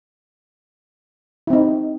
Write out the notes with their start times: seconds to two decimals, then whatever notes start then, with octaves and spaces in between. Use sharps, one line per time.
1.47 E4
1.50 C4
1.53 D#4